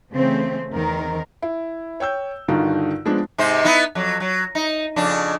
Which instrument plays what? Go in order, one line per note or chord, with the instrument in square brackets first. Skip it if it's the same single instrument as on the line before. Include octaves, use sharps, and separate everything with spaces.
[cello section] C#3 E3 A3 C4
E2 D#3 C4 A#4
[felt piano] E4
C#5 G5 E6 G6
G2 D3 D#3 D#4 F4 F#4
F3 G#3 B3 D4
[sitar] G#2 C3 C5
B3 D#4 E4
F2 F#3
F#3
D#4
F2 C#3 D4